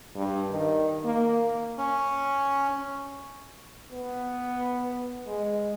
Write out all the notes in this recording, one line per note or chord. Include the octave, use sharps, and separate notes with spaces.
G2
D#3
A#3
C#4
B3
G#3